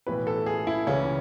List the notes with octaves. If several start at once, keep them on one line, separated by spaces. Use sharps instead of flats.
B1 A2 E3 B4
A4
G#4
E4
C#2 C#3 E3 C#4